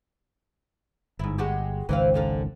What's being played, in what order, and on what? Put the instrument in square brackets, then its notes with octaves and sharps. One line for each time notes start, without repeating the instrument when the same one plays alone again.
[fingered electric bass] G1 [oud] G#2 E4
[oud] G#3 F#4 G4
[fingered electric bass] G#1 C#2 D#3 [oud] E3 C4 F5
[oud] F#2 D3 F5